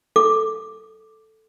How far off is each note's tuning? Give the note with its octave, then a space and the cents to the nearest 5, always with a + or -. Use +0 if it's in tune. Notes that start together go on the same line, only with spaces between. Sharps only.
A4 +0 D6 +0